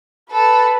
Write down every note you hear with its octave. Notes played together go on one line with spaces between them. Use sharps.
A4 B4